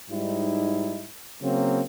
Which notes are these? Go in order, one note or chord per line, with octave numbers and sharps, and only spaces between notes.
G#2 G3 D#4 E4
C#3 F#3 A#3 C4